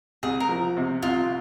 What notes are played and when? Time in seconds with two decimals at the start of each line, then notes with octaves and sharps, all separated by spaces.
0.23 C2 G#4
0.40 A#4
0.49 F3
0.77 C3
1.02 C2 F4